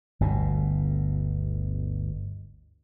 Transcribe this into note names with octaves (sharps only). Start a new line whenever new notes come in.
G1 D2 B2